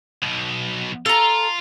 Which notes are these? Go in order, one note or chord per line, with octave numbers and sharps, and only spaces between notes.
B1 B2
F4 A4 A#5